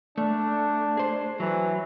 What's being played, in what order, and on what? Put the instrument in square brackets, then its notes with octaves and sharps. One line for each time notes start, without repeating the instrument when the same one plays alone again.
[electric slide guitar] A3 [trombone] D4
[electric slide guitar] G#4 C5
[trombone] E3 [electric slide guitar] F#3